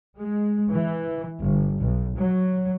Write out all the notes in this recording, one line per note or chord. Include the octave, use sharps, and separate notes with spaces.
G#3
E3
G1
B1
F#3